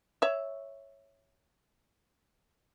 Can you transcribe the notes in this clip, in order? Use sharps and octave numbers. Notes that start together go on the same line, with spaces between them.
C#5 E5